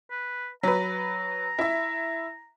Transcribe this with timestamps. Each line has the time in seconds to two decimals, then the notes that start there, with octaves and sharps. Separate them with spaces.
0.11 B4
0.63 F#3 B4 A#5
1.59 E4 E5